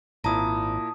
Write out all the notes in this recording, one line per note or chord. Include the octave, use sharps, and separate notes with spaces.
G#1 A#2 E4 A5 A#5 D#6